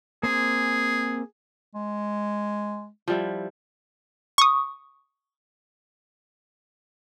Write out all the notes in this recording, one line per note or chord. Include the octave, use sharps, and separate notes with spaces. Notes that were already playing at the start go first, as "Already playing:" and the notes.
A#3 C4 G#4 G#5
G#3
F3 G3 E4
C#6 D#6